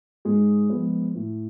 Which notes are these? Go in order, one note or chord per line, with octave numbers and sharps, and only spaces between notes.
G#2 G#3 G#4
F3 G#3 B3
A2